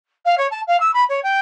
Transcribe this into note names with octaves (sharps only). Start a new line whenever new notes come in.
F5
C#5
A5
F5
E6
B5
C#5
G5